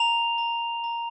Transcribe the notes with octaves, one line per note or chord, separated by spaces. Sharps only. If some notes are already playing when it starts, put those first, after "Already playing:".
Already playing: A#5 F7
A#5
A#5